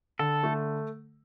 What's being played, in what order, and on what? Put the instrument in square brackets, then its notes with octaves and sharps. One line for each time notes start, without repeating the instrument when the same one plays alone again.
[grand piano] D3 [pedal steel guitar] A4
[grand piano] A3